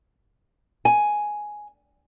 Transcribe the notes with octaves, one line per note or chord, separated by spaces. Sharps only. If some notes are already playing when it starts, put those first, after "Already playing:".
G#5